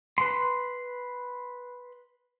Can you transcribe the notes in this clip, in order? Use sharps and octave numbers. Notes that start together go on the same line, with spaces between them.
B4 C6